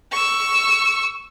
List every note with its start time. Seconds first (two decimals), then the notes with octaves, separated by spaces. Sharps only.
0.12 C#6 E6